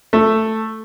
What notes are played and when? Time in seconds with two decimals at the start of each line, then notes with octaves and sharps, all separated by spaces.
0.13 A3